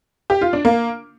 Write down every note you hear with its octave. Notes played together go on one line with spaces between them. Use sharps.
G4
F4
D4
A#3